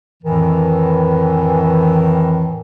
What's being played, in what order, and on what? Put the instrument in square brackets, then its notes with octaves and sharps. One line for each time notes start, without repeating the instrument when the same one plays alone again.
[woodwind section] F2 A2 D#3 E3